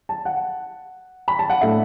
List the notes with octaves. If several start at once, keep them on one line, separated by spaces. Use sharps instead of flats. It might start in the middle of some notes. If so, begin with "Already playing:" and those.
A5
F#5
B5
A5
F#5
A2 A3 D4 E5